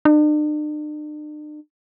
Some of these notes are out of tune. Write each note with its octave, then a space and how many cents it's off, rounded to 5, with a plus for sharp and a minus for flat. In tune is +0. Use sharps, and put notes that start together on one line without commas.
D4 +45